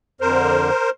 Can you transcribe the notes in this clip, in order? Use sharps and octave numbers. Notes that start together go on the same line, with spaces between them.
F2 D3 A#4 C5